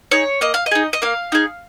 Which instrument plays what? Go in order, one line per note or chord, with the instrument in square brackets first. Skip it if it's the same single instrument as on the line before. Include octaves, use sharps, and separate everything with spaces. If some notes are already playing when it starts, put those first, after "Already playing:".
[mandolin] D#4 G#4 C#5
A#3 D#5
F5
D#5
D#4 G#4
D#5
A#3 F5
D#4 G#4